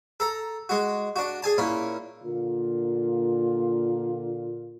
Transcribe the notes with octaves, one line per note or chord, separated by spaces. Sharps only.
A4 A#5
G#3 F#4
D4 F#4
G#4 G#5 A5
A#2 C#4 E4
A#2 D3 A#3 F4